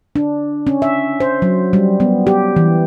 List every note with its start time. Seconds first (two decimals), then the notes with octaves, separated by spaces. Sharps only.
0.16 D4
0.67 C#4
0.82 E5
1.20 C5
1.42 F#3
1.73 G3
2.00 B3
2.27 G4
2.56 E3